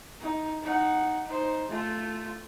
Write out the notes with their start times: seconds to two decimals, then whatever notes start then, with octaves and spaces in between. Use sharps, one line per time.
0.20 D#4
0.62 D#4 F#5
1.25 D#4 C5
1.69 A3 F4